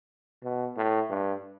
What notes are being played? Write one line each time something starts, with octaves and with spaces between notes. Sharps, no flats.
B2
A2
G2